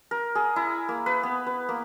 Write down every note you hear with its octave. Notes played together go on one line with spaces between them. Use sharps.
A#4
G#4
E4
A#3
B4
B3
B4
A#3